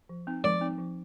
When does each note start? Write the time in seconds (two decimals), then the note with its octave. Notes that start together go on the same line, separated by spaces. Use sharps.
0.09 F3
0.27 C4 D#4
0.44 F3 D5
0.61 C4 D#4
0.78 F3